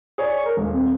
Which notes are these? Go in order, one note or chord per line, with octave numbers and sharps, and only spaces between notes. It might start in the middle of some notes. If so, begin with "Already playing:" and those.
G#4 C#5 D5
C#6
A#4
D#1 G#3
C4